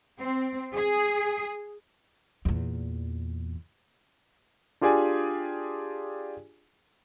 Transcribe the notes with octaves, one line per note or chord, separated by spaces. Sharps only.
C4
G#4
E2 A#2
D4 F4 G4 G#4 D5 G#5